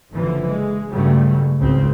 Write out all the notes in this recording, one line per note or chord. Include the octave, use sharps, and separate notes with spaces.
F#1 D3 E3 F3
G#3
G2 C#3 F#3 G3 A3
G#1 C#2 C#3 C4